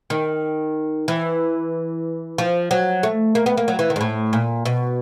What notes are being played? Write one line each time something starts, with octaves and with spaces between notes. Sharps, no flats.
D#3
E3
F3
F#3
A3
A#3
B3
A#3
F#3
E3
D#3
G#2
A2
A#2
B2